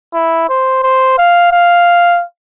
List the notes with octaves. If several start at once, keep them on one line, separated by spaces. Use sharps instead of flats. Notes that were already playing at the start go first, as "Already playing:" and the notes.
E4
C5
C5
F5
F5